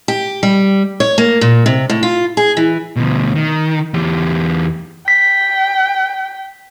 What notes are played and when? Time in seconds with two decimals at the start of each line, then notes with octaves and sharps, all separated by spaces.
0.08 G4
0.43 G3
1.00 C#5
1.18 A#3
1.41 A#2
1.66 C3
1.90 A2
2.03 F4
2.37 G#4
2.57 E3
2.96 D2 B2
3.35 D#3
3.94 E2 G4
5.08 G5 B6